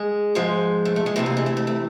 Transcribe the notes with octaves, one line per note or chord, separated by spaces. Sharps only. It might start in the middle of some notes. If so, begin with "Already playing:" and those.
Already playing: G#3
G#2 F3 G#3
A3
A3
G#3
D2 C3 E3 A3
A#3
G#3
A3
A3
A3